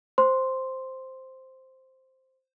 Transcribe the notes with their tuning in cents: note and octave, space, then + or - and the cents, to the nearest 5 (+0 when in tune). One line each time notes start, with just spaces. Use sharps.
C5 +0 C6 +0